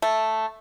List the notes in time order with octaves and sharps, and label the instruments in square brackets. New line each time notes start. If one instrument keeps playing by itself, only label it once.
[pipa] A3